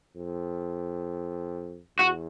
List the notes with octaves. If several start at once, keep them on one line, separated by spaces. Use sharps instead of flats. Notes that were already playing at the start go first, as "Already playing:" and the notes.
F2
E2 F#4